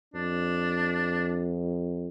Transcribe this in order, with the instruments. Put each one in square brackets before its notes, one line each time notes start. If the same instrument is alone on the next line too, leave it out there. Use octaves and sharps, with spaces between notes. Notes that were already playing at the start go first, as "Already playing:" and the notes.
[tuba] F2 [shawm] D4